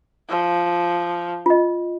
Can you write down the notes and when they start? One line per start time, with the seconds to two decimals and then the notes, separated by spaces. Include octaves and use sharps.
0.29 F3
1.46 F4 D#5